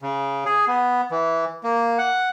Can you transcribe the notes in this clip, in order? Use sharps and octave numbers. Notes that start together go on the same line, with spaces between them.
C#3
G#4
B3
E3
A#3
F#5